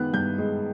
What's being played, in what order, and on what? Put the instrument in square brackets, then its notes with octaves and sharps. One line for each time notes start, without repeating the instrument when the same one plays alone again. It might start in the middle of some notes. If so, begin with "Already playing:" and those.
Already playing: [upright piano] D#3 G#3 B3 F#6
G2 G6
G#3